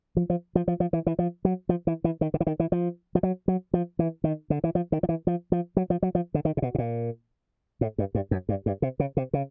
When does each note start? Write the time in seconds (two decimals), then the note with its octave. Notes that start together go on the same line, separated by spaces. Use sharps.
0.17 F3
0.30 F3
0.55 F3
0.68 F3
0.80 F3
0.93 E3
1.06 E3
1.19 F3
1.45 F#3
1.69 F3
1.87 E3
2.04 E3
2.21 D#3
2.34 D3
2.40 E3
2.47 D#3
2.60 E3
2.72 F3
3.15 F3
3.23 F#3
3.48 F#3
3.73 F3
3.99 E3
4.24 D#3
4.50 D3
4.64 E3
4.75 F3
4.92 D#3
5.03 F3
5.09 E3
5.27 F3
5.52 F3
5.77 F#3
5.90 F3
6.03 F#3
6.15 F3
6.34 D3
6.45 D#3
6.57 C3
6.62 B2
6.75 B2
6.78 A#2
7.81 A2
7.98 G2
8.15 G2
8.31 F#2
8.49 G2
8.66 G2
8.82 C3
9.00 C#3
9.17 C3
9.33 C#3